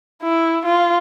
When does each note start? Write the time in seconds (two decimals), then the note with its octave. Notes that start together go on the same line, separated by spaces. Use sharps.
0.23 E4
0.65 F4